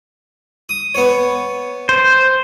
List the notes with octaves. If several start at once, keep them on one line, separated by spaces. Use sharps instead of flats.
D#6
B3 C#5
C5